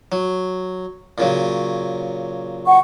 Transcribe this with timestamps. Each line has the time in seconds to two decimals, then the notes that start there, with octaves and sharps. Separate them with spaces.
0.12 F#3
1.18 A#2 C#3 F#3
2.66 F#5 C#6